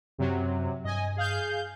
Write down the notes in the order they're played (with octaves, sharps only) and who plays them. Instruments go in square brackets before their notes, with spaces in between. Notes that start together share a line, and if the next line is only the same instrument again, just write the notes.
[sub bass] F#2 [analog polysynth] C3 F#3
[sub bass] G2 [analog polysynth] D#5 G#5
[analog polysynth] G#4 F5 G6